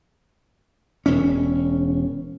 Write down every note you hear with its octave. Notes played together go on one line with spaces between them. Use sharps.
E1 C#4